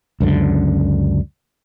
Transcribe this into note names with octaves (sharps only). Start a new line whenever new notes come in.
C#2 F#2 D3